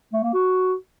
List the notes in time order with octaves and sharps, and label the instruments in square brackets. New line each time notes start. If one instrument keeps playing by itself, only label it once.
[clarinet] A3
A#3
F#4